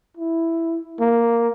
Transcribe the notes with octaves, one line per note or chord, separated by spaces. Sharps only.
E4
A#3